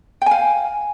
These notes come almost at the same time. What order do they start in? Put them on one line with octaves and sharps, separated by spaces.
G5 G#5 F5